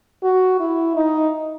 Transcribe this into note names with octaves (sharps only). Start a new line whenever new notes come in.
F#4
E4
D#4